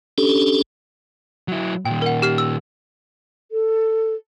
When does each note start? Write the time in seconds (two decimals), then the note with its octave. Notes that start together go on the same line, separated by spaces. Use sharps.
0.18 C#4 D4 G4 A4
1.48 F#3 E4
1.85 A#2 D#3 G5
2.02 A#4 F#5
2.22 G4 F6 C7
2.38 E6
3.52 A4